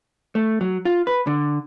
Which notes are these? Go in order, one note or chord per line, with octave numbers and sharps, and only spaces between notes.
A3
F#3
F4
B4
D3